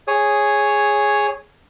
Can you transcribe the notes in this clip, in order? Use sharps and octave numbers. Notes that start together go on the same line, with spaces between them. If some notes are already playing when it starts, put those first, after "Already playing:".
G#4 C#5 D#6